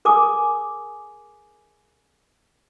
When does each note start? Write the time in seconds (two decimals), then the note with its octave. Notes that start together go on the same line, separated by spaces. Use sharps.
0.05 G#4 A#4 G#5 D6 D#6